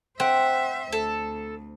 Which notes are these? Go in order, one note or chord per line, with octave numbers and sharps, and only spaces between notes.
C4 C5 E5 F#5
D2 A4